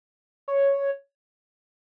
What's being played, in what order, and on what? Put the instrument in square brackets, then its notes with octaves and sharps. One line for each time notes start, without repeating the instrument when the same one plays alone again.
[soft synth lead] C#5